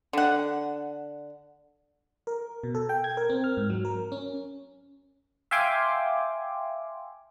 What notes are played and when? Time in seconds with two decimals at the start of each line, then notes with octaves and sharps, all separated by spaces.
0.13 D3 F#5
2.27 A#4
2.64 B2
2.75 A4
2.89 G5
3.04 G#6
3.17 A#4
3.30 C4
3.44 F6
3.57 G#2
3.70 F#3
3.85 A#4
4.12 C#4
5.51 E5 F5 G5 G#5 C6 D6